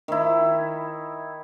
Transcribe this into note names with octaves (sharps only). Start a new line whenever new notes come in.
D#3 E4